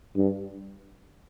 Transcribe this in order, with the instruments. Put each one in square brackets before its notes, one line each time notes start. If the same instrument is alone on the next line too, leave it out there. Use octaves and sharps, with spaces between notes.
[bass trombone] G2